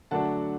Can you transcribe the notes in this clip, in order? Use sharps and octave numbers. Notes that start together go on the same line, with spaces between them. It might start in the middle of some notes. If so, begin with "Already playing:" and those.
D3 F#3 A3 D4 F#5 A5